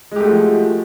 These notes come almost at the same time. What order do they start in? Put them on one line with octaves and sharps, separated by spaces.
G#3 G4 A3 F#4 F3